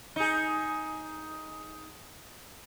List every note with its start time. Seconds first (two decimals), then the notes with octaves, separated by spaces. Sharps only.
0.16 D#4 G#4